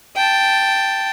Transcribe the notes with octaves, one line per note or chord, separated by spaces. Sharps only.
G5 A5